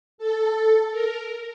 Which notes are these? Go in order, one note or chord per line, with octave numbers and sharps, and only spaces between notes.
A4
A#4